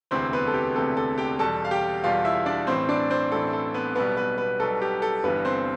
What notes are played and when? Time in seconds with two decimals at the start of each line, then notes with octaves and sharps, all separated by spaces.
0.11 E1 D2 C3 E3 C4 C5
0.33 B3 B4
0.47 A4
0.54 G4
0.75 E1 D2 C3 E3 A4
0.97 A4
1.18 G4 G5
1.39 E2 B2 G3 A4 A5
1.65 F5
1.71 G4 G5
2.04 E2 B2 G3 F4 F5
2.25 E4 E5
2.46 D4 D5
2.67 A1 A2 E3 C4 C5
2.89 D4 D5
3.10 C4 C5
3.32 A1 A2 E3 A4
3.53 A4
3.74 B3 B4
3.95 B1 B2 G3 B3 B4
4.17 B3 B4
4.38 B3 B4
4.59 B1 B2 G3 A4
4.82 G4
5.02 A4
5.23 G1 G2 E3 G3 B3 B4
5.45 C4 C5